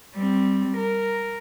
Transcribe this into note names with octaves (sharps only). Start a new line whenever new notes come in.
G3 C4
A#4